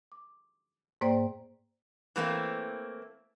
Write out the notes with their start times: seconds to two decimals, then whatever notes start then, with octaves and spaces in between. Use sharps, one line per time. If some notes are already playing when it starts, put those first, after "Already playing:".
0.12 D6
1.01 G#2 A#3 C5 D5 G5
2.16 E3 A3 A#3 C4